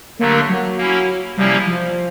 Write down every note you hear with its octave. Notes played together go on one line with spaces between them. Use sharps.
D3 F#3 A3 A#3 D4 G4
F#3
A#3 C#4 E4
C3 F3 G3 A#3 C#4 E4
F3